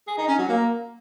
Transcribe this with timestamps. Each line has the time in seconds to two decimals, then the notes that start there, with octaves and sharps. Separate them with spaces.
0.07 G#4
0.18 D#4
0.28 C#4
0.38 F#3
0.49 A#3